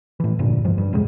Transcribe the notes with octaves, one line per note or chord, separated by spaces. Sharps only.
A2 E3
F1 G2 A#2 D3
A1 D2 G2 F3
G2
A1 F2 C3 G#3